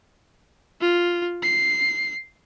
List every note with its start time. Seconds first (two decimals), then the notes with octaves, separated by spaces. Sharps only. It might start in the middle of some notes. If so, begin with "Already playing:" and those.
0.81 F4
1.43 C7